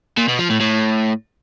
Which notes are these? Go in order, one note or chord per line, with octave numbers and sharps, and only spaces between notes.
A#2
B2
F3
A2
A2